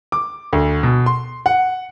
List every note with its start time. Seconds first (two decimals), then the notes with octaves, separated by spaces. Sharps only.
0.12 D6
0.53 D2
0.83 B2
1.06 C6
1.46 F#5